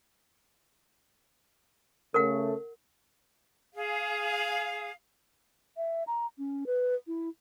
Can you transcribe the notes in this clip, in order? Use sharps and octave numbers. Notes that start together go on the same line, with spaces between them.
C#3 A3 A#4 F#5
G#4 F5
E5
A#5
C#4
B4
E4